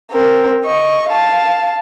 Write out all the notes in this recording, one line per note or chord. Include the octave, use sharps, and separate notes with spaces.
C4 A#4
D#5 C#6
F5 A5